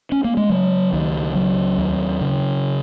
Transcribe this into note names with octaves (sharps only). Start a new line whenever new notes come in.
C#4
A#3
G#3
C#3 F#3
C#2 D#3
C#3 F#3
D#2
C#3